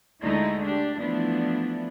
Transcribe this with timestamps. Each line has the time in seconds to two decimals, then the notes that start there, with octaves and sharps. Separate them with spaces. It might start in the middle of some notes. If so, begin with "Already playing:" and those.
0.22 D2 D3 G#3 A3 D#4 E4
0.64 D4 G4
0.96 E3 F3 A3 B3 D4 E4